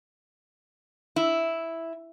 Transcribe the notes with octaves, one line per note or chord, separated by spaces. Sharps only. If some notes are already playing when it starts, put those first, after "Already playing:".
E4